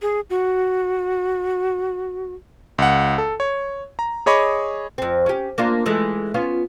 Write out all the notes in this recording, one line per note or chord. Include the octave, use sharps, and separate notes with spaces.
G#4
F#4
C#2 F#5
A4
C#5
A#5
G#4 C#5 D#5 B5 C#6 D6
F2 C4
C#4 G4
A#3 D4 F4
E3 G#3 A3
B3 C#4 F4